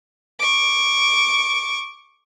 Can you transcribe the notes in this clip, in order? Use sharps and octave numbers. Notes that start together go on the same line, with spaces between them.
C#6 D6